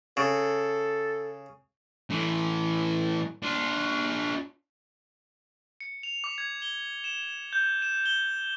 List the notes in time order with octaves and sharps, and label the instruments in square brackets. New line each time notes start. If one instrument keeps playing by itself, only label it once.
[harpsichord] C#3 [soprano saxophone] A4
[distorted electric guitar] A2 E3
D4 F4
[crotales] C#7
F7
D6
G#6
G7
E7
G6
E7
G7